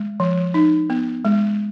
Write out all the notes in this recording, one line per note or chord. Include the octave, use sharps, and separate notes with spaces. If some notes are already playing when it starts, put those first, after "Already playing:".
Already playing: G#3
F3
D#4
B3
G#3